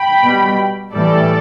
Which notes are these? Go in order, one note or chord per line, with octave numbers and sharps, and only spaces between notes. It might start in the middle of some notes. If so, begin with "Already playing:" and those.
Already playing: G5 B5
B2 G3
A2 E3 G3 A4 D5